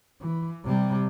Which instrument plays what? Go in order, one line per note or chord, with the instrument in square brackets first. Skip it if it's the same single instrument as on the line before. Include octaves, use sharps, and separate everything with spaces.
[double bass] E3
C3 G3